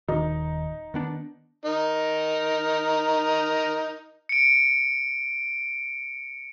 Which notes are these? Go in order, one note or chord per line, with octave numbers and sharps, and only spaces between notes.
D#1 D#3 D#4
D#3 B3 D4
D#4 A#4
C#7 D7